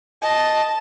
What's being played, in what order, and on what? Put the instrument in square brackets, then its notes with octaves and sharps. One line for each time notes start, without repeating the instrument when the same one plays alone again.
[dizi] D#5 [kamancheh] A5